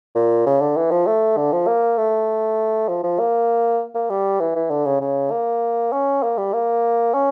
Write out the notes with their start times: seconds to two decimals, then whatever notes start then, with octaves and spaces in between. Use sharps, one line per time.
0.15 A#2
0.46 C#3
0.60 D3
0.77 E3
0.91 F3
1.06 A3
1.37 D3
1.52 F3
1.67 A#3
1.98 A3
2.88 F3
3.03 F3
3.19 A#3
3.95 A#3
4.10 G3
4.40 E3
4.55 E3
4.70 D3
4.85 C#3
5.00 C#3
5.31 A#3
5.92 C#4
6.23 A#3
6.38 G3
6.53 A#3
7.14 C#4